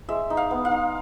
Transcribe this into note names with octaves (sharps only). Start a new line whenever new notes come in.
G#3 E5
D#4
F5
B3
F5
D#4